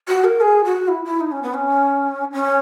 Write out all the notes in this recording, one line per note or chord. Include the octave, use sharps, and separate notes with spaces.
F#4
A#4
G#4
F#4
E4
E4
D#4
C#4
B3
C#4
C#4